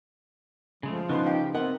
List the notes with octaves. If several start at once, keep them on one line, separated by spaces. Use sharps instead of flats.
C#3 F3 G#3 A3
C#3 B3 D#4 B4 C6
D#4 G4 F5 G5
B3 C4 A#4 F#5